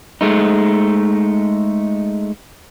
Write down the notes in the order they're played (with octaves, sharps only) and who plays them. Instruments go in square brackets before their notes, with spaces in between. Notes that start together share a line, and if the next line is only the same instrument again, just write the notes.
[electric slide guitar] G#3 A3 D#4